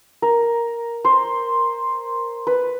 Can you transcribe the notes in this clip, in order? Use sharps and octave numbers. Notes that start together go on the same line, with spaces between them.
A#4
C5
B4